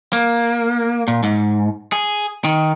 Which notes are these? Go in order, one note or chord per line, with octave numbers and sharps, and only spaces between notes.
A#3
A#2
G#2
G#4
D#3